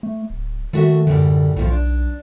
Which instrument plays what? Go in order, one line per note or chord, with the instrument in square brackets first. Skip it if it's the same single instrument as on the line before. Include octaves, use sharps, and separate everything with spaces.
[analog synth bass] A3
D1
[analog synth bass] D#3 [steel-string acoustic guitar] A3 F#4 E5
[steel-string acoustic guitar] F#2 A2 G3 [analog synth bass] D3
[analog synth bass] B1 [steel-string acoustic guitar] A2 E3 F3
[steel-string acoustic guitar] D4